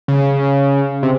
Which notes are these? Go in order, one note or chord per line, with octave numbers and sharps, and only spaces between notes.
C#3
C3